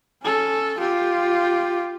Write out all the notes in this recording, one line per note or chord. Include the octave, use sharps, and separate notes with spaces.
C#4 A4
F4 G4